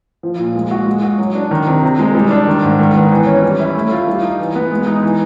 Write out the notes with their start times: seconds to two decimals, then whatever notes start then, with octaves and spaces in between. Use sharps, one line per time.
0.23 F3
0.39 A#2
0.55 G#3
0.71 F#4
0.86 G#3
1.03 F#4
1.18 F#3
1.35 D4
1.51 D#3
1.67 C3
1.83 C3
1.99 G#3
2.15 G3
2.31 D4
2.47 D#3
2.63 G#2
2.79 D#3
2.95 B3
3.11 E3
3.26 C#4
3.43 G3
3.59 E4
3.75 A3
3.91 F4
4.08 G3
4.23 D#4
4.39 E3
4.56 B3
4.71 G#3
4.87 D#4
5.03 E3